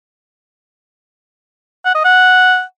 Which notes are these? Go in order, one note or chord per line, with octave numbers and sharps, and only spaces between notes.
F#5
D#5
F#5